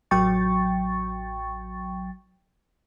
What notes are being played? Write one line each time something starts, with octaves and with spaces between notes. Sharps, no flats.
A1 F#3 G5 C#6 A6